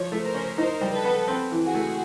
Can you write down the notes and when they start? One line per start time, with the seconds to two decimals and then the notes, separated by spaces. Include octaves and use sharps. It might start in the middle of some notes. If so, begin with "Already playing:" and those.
Already playing: F3 C#5
0.12 A3
0.22 A#4 C5
0.34 C#4
0.57 D#4 A#4 C5
0.81 G3
0.92 A4 B4
1.05 B3
1.28 C4
1.51 E3
1.63 F#4 G#4
1.75 A3